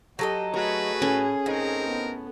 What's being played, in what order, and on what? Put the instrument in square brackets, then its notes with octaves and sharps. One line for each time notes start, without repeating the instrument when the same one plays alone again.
[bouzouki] F#3 A4 D#5 [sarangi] G4
[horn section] A3 F#4 B4 [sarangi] G#4 [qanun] C#5
[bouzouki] A2 [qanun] C#4
[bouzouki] A2 [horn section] C4 D#4 A#4
[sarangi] B3